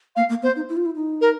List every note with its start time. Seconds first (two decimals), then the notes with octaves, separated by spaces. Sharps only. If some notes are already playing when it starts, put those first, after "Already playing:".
0.16 A#3 F5
0.29 A#3
0.42 B3 C5
0.56 D#4
0.69 E4
0.77 F4
0.86 E4
0.95 D#4
1.21 A#4